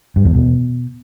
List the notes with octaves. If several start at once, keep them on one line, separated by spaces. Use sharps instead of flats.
G2
E2
B2